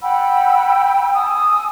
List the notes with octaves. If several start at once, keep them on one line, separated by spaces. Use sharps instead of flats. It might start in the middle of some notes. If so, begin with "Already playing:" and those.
F#5 G5 B5 E6
G#5 D#6 E6